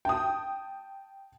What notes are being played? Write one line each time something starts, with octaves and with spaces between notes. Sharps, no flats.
G5 A5 D#6